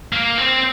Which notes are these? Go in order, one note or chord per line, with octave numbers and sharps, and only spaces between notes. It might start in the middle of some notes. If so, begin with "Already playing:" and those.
A#3
C4